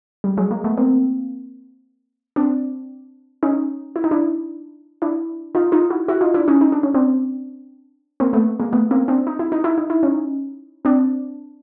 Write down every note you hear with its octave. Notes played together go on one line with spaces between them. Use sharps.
G3
F#3 G#3
G#3 A#3
A3 B3
A#3 C4
C4 D4
C#4 D#4
E4
D#4
D4 E4
D4 E4
D#4 F4
D#4 F4
E4 F#4
E4 F#4
D#4 F4
D4 E4
C#4 D#4
D#4
D4
C#4
C4 D4
A#3 C4
A3 B3
G#3 A#3
A3 B3
A#3 C4
C4 D4
D#4
E4
D#4
E4
D#4
E4
C#4 D#4
C4 D4